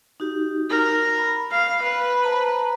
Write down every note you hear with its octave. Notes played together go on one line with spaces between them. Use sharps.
D#4 F#4 G4
A#4
B5
F5
B4
C5 A5 A#5